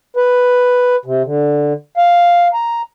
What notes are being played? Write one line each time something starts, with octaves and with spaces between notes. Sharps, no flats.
B4
C3
D3
F5
A#5